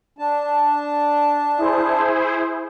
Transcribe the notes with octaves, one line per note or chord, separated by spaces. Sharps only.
D4 A5
E4 G#4 C5